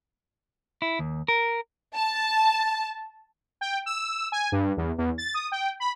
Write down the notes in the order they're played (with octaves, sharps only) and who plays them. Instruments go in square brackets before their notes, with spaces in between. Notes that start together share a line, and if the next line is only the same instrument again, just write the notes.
[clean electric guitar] E4
D#2
A#4
[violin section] A5
[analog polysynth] G5
E6
G#5
G2
E2
E2
A6
D#6
G5
B5